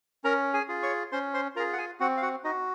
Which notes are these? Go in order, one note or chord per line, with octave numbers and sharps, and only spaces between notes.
C#4 A#4 A#5
G#4 G#5
F4 G#4
C#5 C#6
C#4 C5 C6
C5 C6
F4 G#4 A#4 A#5
F#5
G#4 G#5
C4 F#4 F#5
F5
F#4 F#5
D#4 F#4 D#5